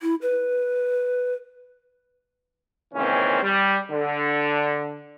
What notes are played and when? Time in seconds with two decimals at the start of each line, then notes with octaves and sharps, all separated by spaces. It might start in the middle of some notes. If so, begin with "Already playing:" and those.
0.01 E4
0.22 B4
2.94 C#2 A#2 D#3 E3 C4 C#4
3.43 G3
3.91 D3